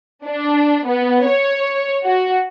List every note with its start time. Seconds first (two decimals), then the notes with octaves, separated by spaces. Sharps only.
0.25 D4
0.86 B3
1.26 C#5
2.04 F#4